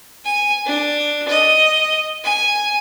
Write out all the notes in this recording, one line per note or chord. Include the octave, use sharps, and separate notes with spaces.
G#5
D4
D#5
G#5